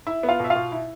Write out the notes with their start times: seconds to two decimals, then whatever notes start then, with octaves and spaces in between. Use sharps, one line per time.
0.07 E4 E5
0.23 B3
0.29 F4 F5
0.40 B2 E5
0.50 F4 F5
0.56 B2
0.72 E4